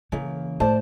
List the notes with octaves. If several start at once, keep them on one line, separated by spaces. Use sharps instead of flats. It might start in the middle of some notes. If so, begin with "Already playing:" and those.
C#3 E3 A#3
A2 C5 D5 A5